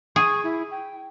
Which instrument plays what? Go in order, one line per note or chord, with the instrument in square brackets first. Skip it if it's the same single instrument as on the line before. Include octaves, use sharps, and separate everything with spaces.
[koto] G#4 [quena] C#6
[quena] E4
G5